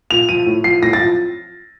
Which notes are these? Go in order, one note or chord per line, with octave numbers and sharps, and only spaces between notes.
A#2 F7
F3 D#7
A2
F3 C7
A2 A#6
A6
F3